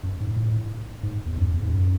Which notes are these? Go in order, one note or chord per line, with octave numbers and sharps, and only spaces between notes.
F#2
G#2
G#2
A2
G#2
E2
F#2
E2
G#2
F#2